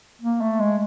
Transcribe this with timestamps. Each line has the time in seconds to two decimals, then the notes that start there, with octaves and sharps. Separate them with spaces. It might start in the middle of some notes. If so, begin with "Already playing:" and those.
0.22 A#3
0.41 A3
0.60 G#3